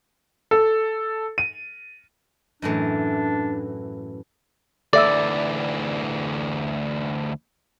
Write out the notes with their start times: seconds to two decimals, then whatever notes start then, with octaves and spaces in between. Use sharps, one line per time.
0.51 A4
1.38 D#7
2.62 F#2 A2 E3 D4
4.93 D2 E3 A4 D5 E5 E6